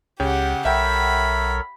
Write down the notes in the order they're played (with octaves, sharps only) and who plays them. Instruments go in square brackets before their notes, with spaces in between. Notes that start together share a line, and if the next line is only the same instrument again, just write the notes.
[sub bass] C#2 [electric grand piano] C#3 C#5 G5 [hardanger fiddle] G4 F#5
[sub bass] B1 [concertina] A4 A#4 C#5 [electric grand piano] E5 F#5 G5 [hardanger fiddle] B5